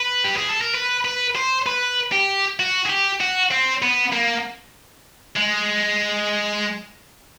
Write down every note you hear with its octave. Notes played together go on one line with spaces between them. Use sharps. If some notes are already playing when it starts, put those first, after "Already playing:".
Already playing: B4
G4
G#4
A4
A#4
B4
B4
C5
B4
G4
F#4
G#4
G4
F#4
C4
B3
A#3
G#3